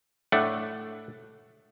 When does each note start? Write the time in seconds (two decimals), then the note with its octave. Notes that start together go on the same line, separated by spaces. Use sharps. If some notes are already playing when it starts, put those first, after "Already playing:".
0.32 A2 A3 D4 F#5